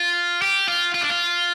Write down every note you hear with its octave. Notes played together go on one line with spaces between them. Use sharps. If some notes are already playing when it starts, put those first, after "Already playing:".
Already playing: F4
G4
F4
F4
D4
F4